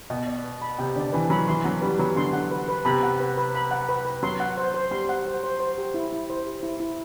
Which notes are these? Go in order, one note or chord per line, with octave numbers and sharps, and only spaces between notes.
B2 G5
D5
B4
B5
C3 G5
D3 D5
E3 B4
F#3 B5
E3 C6
F#3 F#5
G3 B4
F#3 B4
D3 C6
F#5
B4
B4
C3 B5
F#5
B4
B4
B5
F#5
B4
B4
F#3 C6
F#5
C5
C5
G3 C6
F#5
C5
C5
C5
G4
E4
E4
C5
G4
E4
E4